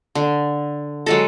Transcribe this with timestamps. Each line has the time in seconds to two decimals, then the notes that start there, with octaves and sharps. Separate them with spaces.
0.15 D3
1.06 F#3 G#3 A4